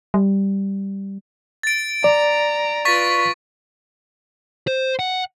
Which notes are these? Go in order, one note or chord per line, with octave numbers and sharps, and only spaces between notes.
G3
A6 D7
D5 A#5
F4 B4 C#6 A6 B6
C5
F#5